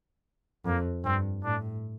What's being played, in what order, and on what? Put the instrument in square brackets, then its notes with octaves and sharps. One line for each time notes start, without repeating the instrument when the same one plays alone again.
[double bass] F2 [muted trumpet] A#3
[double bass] G2 [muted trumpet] C4
[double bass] A2 [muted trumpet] D4